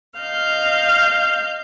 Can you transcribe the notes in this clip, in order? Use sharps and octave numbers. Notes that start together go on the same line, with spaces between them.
D#5 F5 F6 G6